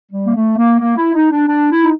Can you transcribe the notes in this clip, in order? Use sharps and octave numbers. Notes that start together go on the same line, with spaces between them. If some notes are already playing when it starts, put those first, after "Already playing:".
G3
A#3
A3
A#3
A#3
E4
D#4
D4
D4
E4
D#4